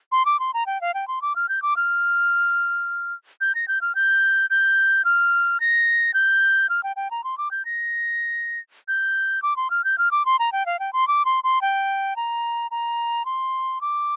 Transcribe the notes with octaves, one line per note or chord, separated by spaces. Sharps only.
C6
D6
C6
A#5
G5
F5
G5
C6
D6
F6
G6
D6
F6
G6
A#6
G6
F6
G6
G6
F6
A#6
G6
F6
G5
G5
A#5
C6
D6
G6
A#6
G6
D6
C6
F6
G6
F6
D6
C6
A#5
G5
F5
G5
C6
D6
C6
C6
G5
A#5
A#5
C6
D6